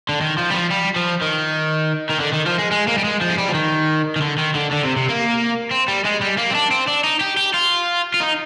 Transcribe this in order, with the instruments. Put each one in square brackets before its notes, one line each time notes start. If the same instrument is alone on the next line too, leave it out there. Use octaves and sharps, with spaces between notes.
[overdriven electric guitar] D3
D#3
F3
G3
F3
G3
F3
D#3
D#3
D3
D#3
F3
G#3
G#3
A#3
G3
G#3
F3
G#3
G3
F3
D#3
D#3
D3
D#3
D3
D3
C3
C3
A#3
C4
G3
G#3
G3
A#3
C4
D4
C4
D4
D#4
G4
G4
F4
F4
D#4